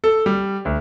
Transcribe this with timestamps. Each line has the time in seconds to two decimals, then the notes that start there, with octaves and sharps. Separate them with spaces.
0.04 A4
0.26 G3
0.65 D2